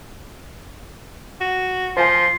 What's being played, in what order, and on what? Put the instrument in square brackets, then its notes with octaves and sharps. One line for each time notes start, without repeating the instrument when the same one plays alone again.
[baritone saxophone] F#4
[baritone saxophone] F3 [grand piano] C5 F5 G#5 [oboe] C6